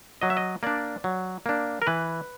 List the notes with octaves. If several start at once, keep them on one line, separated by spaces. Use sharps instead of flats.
F#3 D#5
E5
D#5
A#3 D4 D5
F#3
A#3 D4
A#4
E3 B4